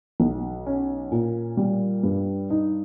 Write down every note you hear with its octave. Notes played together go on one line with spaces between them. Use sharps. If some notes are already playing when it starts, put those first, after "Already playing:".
B1
C#4
A#2
G3
G2
D#4